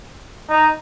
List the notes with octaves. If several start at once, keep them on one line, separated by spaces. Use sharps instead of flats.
D#4